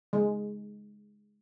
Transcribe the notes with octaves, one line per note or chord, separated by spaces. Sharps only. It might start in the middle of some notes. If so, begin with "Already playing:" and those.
G#3